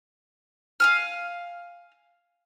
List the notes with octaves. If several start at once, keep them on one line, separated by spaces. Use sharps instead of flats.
F5 G#5 F6